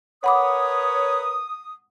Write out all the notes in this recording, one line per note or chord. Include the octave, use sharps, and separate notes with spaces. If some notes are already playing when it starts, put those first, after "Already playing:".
A#4 B4 C#5 F#5 B5 D6 D#6